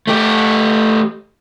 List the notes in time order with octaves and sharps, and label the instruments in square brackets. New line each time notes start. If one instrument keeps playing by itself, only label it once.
[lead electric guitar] A3 G4